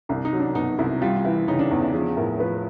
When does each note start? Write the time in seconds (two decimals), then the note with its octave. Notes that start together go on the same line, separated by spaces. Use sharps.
0.09 C2 D4
0.25 D#4
0.33 F#3
0.40 D4
0.55 B2 D#4
0.79 C2 E4
1.01 G3 F4
1.25 E3 E4
1.48 C#3 D#4
1.59 D4
1.71 E2 D#4
1.82 D4
1.94 F3 G#4
2.17 A2 A#4
2.40 F3 B4